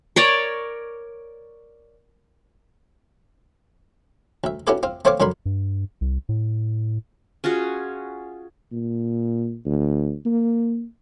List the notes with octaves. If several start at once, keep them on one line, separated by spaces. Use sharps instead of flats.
A#4 C#5 D5
D2 E5
C#4 E4 F#4 G4 A4 B4
C4 F4
A3 C4 C5 C#5 F5 D6
F2 D3 F#3 A#4 B5 C6
G2
C2
A2
C#4 F4 F#4 G#4
A#2
D2
A#3